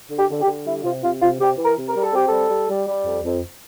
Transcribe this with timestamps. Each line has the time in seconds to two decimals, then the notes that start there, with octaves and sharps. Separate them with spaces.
0.10 D3
0.17 G4
0.30 D3
0.41 G4
0.47 D3
0.66 G3 E4
0.84 C3 F4
1.04 C3 F4
1.21 C3 F4
1.40 C3 G4
1.58 E3
1.65 A#4
1.76 C3
1.88 A#4
1.95 G3
2.02 A4
2.13 C4 G4
2.26 G3 A4
2.50 G3
2.69 G3
2.87 G3
3.05 F2
3.24 F2